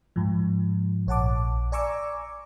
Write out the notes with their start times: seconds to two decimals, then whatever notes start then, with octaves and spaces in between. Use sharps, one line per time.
0.16 G#2 F3
1.07 A#1 C#5 F#5 A5 D6
1.72 D5 G#5 A#5 C#6 D6 E6